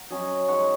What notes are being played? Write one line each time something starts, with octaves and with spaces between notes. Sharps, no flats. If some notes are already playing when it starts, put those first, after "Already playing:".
Already playing: F#5 A#5
F#3 C#4 D#5 G#5
G#3 D#4 C#5 F#5